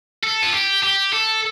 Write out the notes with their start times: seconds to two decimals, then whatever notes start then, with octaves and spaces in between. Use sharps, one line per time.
0.23 A4
0.42 F4
0.52 G4
0.83 G4
1.13 A4